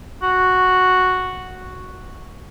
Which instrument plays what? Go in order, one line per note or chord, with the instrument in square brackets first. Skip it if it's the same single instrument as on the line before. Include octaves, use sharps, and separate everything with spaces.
[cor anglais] F#4